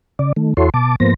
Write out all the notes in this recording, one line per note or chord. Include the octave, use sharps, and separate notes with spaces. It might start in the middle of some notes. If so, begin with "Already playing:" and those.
C#3 D5
D#3 A3
E2 E4 F#4 A4 C#5 C6
B2 A5 D6
G#2 F3 A#3 B3 C5 A#6